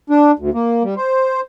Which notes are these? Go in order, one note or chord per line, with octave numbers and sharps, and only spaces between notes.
D4
D2
A#3
G3
C5